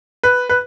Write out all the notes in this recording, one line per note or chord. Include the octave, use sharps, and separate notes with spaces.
B4
B4